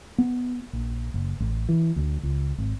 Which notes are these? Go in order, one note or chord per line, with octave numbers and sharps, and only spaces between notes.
B3
A#1
F#1
A1
E3
D2
C#2
G#1